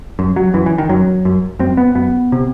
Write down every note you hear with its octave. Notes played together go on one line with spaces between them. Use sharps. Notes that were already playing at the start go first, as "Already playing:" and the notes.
F#2
F#3
F#2 E3
E3
D#3
F#2 F#3
F#2
F#2 C4
B3
F#2 B3
C3